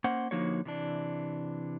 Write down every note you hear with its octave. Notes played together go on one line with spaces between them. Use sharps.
A#3 C#4 C5 F#5
D3 F3 A#3 D#4 F#4 C#5
C3 E3 D4